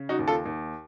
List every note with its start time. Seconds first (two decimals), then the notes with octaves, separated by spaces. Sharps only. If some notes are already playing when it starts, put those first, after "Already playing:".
Already playing: C#3
0.09 D#4 F#4
0.19 D#2
0.28 F4 A4
0.46 D#2